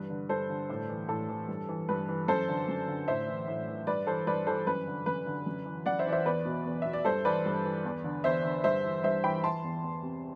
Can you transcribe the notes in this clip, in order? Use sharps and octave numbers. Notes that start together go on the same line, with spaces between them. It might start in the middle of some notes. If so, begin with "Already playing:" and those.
Already playing: G2 E3 B4
D3
G2 A4 C5
D3
A2
E3
A2 A4
E3
G2
E3
G2 B4
E3
F#2 A4 C5
D3
F#2
D3
A2 C5 E5
E3
A2
E3
G2 B4 D5
E3 A4 C5
G2 B4 D5
E3 A4 C5
F#2 B4
D3
F#2 B4
D3
F#2
E3
F#2 D5 F#5
C5 E5
E3 D5
C5 E5
E2 B4 D5
B2
E2
B2 E5
D5
G2 A4 C5
E3 B4 D5
G2
E3
E2
D3
E2 C5 E5
D3
G2 C5 E5
E3
G2 C5 E5
E3 G5 B5
E3 A5 C6
E2
E2
C3